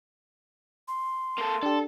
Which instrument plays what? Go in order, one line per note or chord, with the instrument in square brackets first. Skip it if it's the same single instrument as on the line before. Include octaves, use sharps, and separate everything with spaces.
[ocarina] C6
[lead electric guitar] A#3 A4
[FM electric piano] D4 G4 [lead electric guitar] A4